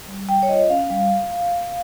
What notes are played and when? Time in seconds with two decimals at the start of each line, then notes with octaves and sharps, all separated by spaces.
0.08 G3
0.29 G3 G5
0.43 C#5
0.49 F4 D#5
0.70 C#4 F5
0.90 G3